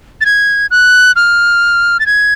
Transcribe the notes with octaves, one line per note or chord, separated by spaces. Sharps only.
A6
G#6
F#6
F6
A6
G#6